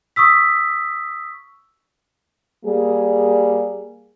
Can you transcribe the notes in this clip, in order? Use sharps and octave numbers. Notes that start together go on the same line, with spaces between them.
C#6 D#6 E6 B6
G3 A#3 G#4